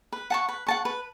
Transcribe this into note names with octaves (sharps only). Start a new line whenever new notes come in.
B4
F#5 A5 C#6
B4
F#5 A5 C#6
B4